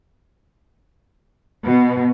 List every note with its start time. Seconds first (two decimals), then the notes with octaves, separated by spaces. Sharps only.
1.64 B2